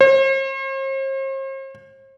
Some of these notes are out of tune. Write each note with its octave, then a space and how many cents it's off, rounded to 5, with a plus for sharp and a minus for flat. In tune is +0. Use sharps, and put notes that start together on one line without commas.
C5 +45